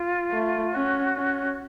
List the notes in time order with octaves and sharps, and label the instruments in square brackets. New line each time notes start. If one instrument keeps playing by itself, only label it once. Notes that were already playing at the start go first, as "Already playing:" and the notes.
Already playing: [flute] F4
[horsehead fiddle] A3
[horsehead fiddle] C#4 [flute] F#4
[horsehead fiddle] C#4